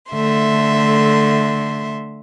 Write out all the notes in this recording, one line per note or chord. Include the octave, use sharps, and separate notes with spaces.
D3 A3 E5 C6